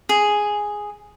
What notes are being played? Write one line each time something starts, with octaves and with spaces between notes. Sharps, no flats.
G#4